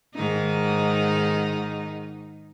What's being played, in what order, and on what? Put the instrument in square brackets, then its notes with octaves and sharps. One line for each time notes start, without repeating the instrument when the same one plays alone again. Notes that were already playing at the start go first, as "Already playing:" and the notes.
[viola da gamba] G#2 D#3 D#4